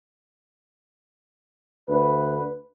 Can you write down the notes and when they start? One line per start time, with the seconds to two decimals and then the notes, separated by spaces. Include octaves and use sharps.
1.89 D2 B4